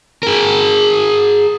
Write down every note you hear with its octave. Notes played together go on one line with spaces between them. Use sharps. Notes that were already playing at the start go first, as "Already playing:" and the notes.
G#4 A#4